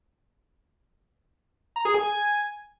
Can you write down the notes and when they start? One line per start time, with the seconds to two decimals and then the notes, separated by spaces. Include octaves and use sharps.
1.76 A#5
1.85 G#4
1.94 G#5